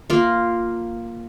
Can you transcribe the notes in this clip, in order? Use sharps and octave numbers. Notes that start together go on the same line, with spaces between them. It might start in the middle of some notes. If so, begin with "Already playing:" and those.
A#3 F4